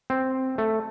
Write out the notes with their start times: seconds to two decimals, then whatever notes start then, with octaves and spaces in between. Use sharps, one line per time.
0.10 C4
0.58 A3